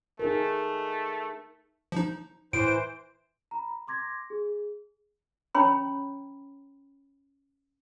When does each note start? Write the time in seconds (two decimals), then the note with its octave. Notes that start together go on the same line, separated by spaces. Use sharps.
0.19 A3 D#4 G#4 A#4
1.92 F3 D#4
2.53 A2 E3 C5 D7
3.51 A#5 B5
3.69 A#5
3.87 C6 D6 G#6 A#6
4.30 G#4
5.55 C#4 C#5 G5 A#5 B5 C#6